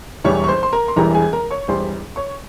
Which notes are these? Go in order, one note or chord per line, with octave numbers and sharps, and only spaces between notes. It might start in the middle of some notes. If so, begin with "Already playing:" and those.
E1 E2 E3 G3 C#5 C#6
C#6
C5 C6
C6
A#4 A#5
C6
E1 E2 E3 G3 A#4 A#5
G#4 G#5
A#4 A#5
C#5 C#6
E1 E2 E3 G3 C5 C6
C#5 C#6